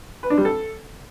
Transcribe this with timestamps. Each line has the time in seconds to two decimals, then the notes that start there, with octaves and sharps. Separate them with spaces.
0.23 B4
0.30 D4
0.38 G3
0.45 A4